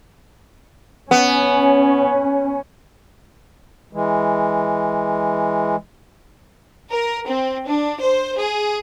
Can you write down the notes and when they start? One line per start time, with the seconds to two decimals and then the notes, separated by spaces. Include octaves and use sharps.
1.11 B3 C#4
3.93 E3 G#3
6.91 A#4
7.27 C4
7.66 D4
8.01 C5
8.38 G#4